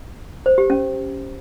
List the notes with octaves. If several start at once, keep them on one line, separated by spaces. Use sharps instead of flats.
C5
G4
C#4